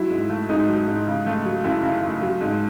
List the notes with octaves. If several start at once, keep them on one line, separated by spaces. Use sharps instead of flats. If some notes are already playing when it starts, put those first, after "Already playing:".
Already playing: F#3 E4
G#2
A3
G#2 D#4
F#3
G#2
C#3
A3
F#3
F#2 E4
C#3
A3
F#3
G#2